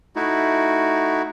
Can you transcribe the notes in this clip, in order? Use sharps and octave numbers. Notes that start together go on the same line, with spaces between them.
A3 D#4 E4 F#4